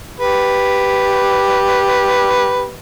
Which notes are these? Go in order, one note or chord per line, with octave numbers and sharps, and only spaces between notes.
G4 B4